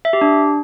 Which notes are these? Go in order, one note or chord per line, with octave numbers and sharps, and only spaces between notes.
E5
G4
D4